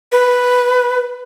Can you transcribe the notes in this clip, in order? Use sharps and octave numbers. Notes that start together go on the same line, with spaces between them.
B4